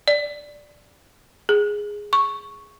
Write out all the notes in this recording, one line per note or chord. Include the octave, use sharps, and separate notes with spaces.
D5
G#4
C#6